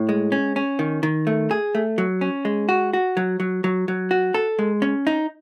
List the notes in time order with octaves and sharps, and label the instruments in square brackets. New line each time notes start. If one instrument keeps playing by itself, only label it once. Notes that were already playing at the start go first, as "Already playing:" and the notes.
Already playing: [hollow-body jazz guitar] A2
G#3
C#4
C#4
D#3
D#3
A3
G#4
A3
F#3
C#4
G#3
F#4
F#4
F#3
F#3
F#3
F#3
F#4
A4
G#3
C#4
D#4